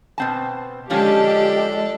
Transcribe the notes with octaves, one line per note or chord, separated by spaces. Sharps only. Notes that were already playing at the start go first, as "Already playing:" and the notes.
B2 C4 A5
D3 F3 G#3 C#4 D4 G4 A4